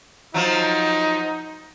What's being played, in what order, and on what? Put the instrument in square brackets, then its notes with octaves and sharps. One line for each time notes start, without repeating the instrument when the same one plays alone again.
[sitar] F3 F#3 [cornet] D#4